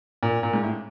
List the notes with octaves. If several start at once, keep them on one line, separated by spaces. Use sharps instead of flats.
A#2
A#2
G#2
A2